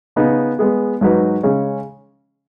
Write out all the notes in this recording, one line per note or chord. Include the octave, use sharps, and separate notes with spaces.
C#3 B3 D#4
G#3 B3 G#4
G#2 F#3 D#4 B4
C#3 G#3 C#4